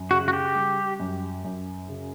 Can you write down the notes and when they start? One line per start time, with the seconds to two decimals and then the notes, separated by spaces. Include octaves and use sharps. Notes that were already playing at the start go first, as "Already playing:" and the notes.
Already playing: F#2
0.11 C#3 F#4
0.28 F#4
0.33 G4
0.55 G3
1.00 F#2
1.44 F#2
1.88 C#3